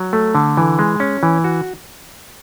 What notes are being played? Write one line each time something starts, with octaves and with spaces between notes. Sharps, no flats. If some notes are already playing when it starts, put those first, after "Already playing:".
Already playing: F#3
A3
D3
E3
G#3
C#4
E3
F#4